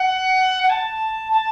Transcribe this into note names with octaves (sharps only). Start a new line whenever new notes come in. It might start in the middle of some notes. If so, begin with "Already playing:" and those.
Already playing: F#5
F#5
A5
A5